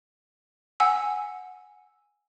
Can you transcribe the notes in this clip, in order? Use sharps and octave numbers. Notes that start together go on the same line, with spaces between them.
F#5 G#5 E6